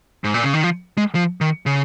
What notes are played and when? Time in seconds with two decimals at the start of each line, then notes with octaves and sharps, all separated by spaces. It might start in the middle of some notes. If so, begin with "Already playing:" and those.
0.24 G#2
0.34 A#2
0.43 C#3
0.54 D#3
0.64 F3
0.98 G#3
1.15 F3
1.41 D#3
1.66 C#3